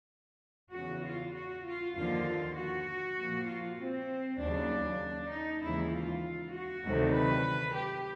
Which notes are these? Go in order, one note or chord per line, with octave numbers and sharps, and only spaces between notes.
E2 C#3 E3 F#4
F4
F#4
F4
D#2 D3 F3 F4
F#4
A#2 F3 A#3
F4
C4
D#2 C#3 F#3 D4
D#4
D#2 C#3 E3 G#3 E4
F4
F#4
D2 C3 D#3 F#3 A3
B4
G4